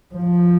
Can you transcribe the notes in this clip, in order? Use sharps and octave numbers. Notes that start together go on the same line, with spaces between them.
F3